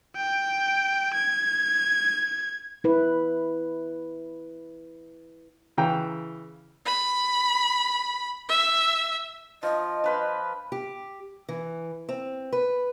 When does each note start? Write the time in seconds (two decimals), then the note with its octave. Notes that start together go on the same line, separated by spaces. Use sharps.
0.16 G5
1.14 G#6
2.84 E4 B4
5.77 C#3 E3 G5 A#5
6.86 B5
8.49 E5
9.63 F3 D#5
10.04 F3 B4 C6
10.72 G4
11.49 E3
12.09 C4
12.53 B4